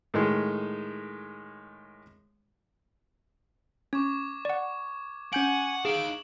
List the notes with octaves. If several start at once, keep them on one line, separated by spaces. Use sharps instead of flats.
A2 D#3 G#3
C#4 C#6 D6 G#6
D5 F#5
C#4 F#5 G#5 G6 D7 F#7
D#4 G#4 F5 D7 E7